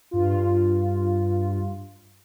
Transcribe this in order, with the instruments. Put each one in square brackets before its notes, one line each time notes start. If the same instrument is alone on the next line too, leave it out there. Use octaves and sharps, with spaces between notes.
[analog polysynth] G2 F4